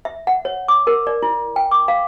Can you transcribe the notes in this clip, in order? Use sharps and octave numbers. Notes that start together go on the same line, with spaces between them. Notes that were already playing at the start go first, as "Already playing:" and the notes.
E5
F#5
C#5
D6
A#4
D5
E4
G5
D6
F5